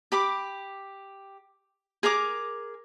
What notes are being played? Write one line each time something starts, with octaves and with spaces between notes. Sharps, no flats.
G4 B5 D6
G#4 A#4 A#5 D6